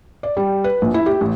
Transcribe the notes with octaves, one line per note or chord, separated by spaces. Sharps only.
D5
G3
B4
A#1
E4
G4
A1